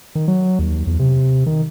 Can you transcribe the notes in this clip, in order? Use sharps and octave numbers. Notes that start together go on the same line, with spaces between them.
D#3
F#3
D#2
E2
C3
D#3